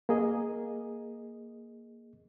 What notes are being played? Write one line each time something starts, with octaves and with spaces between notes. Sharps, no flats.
A#3 G#4 D#5